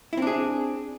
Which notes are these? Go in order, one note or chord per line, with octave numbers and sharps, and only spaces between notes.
C4 D4 E4 G#4